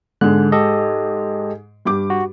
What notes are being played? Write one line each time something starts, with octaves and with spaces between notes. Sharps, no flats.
G#2 D3 G#3 F#6
G4 A4 D#5
G2 G4 D6
F#4